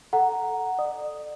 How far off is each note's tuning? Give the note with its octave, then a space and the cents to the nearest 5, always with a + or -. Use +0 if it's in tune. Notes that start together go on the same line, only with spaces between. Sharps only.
A4 +0 F#5 +0 A#5 +0
D5 +35 D#6 +0